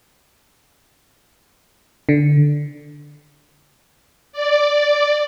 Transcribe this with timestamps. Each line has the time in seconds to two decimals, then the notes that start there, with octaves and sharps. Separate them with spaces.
2.09 D3
4.32 D5